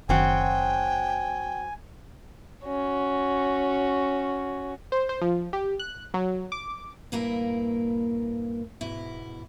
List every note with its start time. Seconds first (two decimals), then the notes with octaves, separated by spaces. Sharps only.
0.09 F#1 D#3 F#3 C4 F#4 G5 G#5
2.65 C#4 F#4
4.92 C5
5.09 C5
5.22 F3
5.53 G4
5.80 F#6
6.14 F#3
6.52 D6
7.12 G2 A#2 A#3 E4 A#4 B4
8.81 G#2 B2 E4